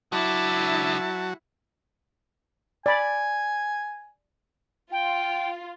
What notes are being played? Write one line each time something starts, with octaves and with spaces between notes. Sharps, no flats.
C#2 F#3 D4 E4 F#4 E5 A5
D5 G#5 B5
F4 G5